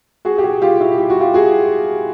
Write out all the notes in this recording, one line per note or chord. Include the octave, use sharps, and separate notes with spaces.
F#4 G#4
G4
F#4 G#4
F4 G4
E4 F#4
G4
F#4
F4 G4
F#4 G#4